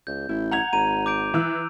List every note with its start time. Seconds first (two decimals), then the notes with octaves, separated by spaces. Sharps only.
0.07 C#2 G6
0.29 A1 E4
0.51 F#5 A#5 G#6 F7
0.73 G#1 A#5 D#7
1.06 D6 G6 D7
1.34 E3 E6 F#6